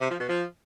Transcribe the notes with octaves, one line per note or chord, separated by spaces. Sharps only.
C3
F3
B2
F3